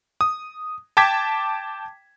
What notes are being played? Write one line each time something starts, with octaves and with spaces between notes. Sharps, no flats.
D#6
G5 A5 D6 G#6 B6